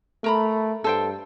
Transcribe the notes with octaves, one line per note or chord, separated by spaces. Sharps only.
A3 A#4 A#5 B5
G2 A4 C5 G5